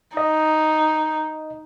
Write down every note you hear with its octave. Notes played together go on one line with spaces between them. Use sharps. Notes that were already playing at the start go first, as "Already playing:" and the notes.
D#4 D#5